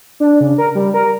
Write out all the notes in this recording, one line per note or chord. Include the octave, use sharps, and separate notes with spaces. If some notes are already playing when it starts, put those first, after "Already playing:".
D4
C#3
A#4
G3
A#4